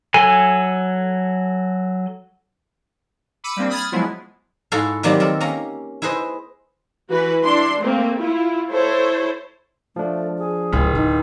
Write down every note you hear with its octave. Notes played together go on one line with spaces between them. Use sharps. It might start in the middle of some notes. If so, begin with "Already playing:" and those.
F#3 A4 G#5
B5 D6 E6 C#7 D#7
G3 A#3 C4 D4
B5 D#6 F6 G#6 A6
F3 F#3 G#3 B3 E4 F4
G#2 E4 F#4 G#4 A4 F5
D#3 F#3 G3 A#3 C4 G4
C4 A4 A#4
A#3 C#4 A#5
E4 G#4 B4 C5 D#5
E3 F#4 B4
D4 E4 C6
A3 A#3 C4
E4 F4
E4 A4 C5 C#5
F3 A3 D4
G#4
D1 C#2
D3 D#4